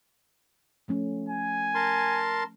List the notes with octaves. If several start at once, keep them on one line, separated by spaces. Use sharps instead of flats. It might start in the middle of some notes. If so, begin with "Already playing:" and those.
F3 A3 C#4
G#5
A#4 A5 C6